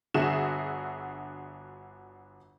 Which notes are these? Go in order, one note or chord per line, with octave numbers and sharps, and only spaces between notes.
G1 D3 F#4 G#4 E5 E7